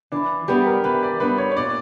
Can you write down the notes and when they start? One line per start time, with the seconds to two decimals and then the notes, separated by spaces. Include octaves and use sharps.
0.12 E3 D4
0.48 G3 B3 D4 G4
0.66 A#4
0.84 E3 B4
1.03 D5
1.20 G3 B3 D4 B4
1.38 C#5
1.52 C#5
1.57 A#2 D5